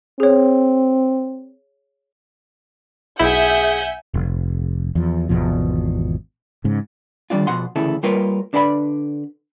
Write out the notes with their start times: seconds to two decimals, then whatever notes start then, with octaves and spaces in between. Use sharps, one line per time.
0.20 C4 G#4 C#5
3.19 B1 E4 G#4 E5 F#5 G#5 G6
4.14 F1
4.95 E2 F3
5.29 G#1 E2 B2 F3
6.64 G#2 C#3
7.30 D3 D#3 G3 C4 D4 F4
7.47 B2 F3 F#5 C6
7.76 D2 C#3 E3 E4 A4
8.03 G3 A#3 F4 A#4 B4 C#5
8.53 D3 D4 B4 D5 F#5 B5